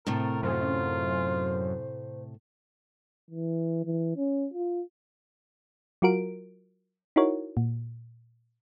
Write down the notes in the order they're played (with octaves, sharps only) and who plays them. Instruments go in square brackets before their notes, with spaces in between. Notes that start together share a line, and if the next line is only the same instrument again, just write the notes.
[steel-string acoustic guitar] A2 C3 A3 [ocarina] C4 [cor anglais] A#4
[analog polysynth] F#2 [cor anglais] F4 [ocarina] C5
[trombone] E3
E3
C#4
F4
[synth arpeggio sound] F#3 F4 F#4 A#4 D7
D#4 E4 F#4 A#4 C#5
A#2